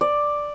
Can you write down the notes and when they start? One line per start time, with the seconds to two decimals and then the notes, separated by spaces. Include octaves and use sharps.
0.01 D5